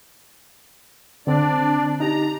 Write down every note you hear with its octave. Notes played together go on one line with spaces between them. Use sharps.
D3 C4 D4 D5
D#4 G4 A#5